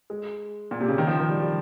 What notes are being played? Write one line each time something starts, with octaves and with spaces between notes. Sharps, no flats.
G#3
A#2
C3
C#3
D#3
F3
D#3
G3
G3